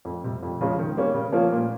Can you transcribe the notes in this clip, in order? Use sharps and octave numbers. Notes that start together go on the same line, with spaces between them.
F2
C3 G3
F2
C#3 F3 G#3 C#4
D#3
G3 A#3 C#4
C#3
F3 A#3 C#4 F4
A#2